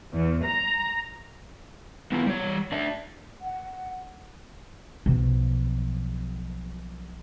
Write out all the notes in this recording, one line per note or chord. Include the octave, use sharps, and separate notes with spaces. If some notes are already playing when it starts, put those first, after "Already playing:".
E2
A#5
B3 E4 F4
G3 C#5
D4 D5 E5
F#5
B1 F3